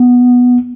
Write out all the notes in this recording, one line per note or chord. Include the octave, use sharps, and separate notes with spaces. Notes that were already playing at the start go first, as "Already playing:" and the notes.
Already playing: B3